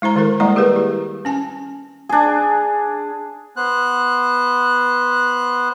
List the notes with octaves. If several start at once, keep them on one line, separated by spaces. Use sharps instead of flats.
G#3 E4 C5 A#5
D#3 G#3 E4 A4 A#4
G3 G#3 A#3 E4 D5 A#5
G4 G#4 A#4 B4
E4
C#4 G#5 A5
D4 G#4
B3 C5 F#6